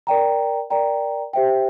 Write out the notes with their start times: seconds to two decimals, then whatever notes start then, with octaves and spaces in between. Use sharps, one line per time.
0.07 A#4 D5 G5 A#5
0.70 A#4 D5 G5 A#5
1.33 G4 C5 E5 G5